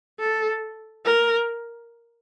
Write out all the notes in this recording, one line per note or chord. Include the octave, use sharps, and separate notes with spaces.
A4
A#4